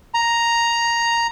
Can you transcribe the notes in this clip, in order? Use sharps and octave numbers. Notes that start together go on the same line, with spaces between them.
A#5